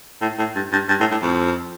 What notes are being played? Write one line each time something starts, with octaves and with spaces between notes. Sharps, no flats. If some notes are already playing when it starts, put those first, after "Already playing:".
A2
A2
G2
G2
G2
A2
A2
F2